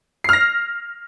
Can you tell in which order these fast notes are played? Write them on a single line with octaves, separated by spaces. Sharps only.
C7 F6 A#6